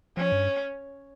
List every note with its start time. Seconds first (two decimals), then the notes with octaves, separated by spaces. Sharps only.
0.17 F3 C#4
0.32 G2